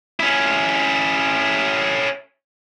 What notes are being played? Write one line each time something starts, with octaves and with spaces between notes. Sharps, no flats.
C#4 E4